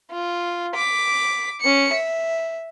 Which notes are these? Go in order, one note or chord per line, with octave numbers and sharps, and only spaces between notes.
F4
D6 B6
C#4 C#7
E5